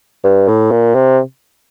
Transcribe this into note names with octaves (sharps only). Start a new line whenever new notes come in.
G2
A2
A#2
C3